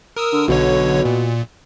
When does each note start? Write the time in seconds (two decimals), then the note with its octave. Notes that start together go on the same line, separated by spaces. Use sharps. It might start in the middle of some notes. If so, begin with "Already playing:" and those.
0.17 A#4 D#6 E6
0.33 D3
0.48 B1 B2 D3 C#5
1.05 A#2